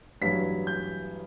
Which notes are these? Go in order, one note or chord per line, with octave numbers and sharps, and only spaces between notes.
A1 G2 F#3 B6
G6